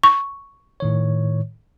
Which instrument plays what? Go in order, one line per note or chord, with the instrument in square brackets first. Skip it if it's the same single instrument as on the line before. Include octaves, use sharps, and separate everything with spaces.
[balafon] C#6
[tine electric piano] A2 D#3 C#5